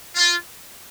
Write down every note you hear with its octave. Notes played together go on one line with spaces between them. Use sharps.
F4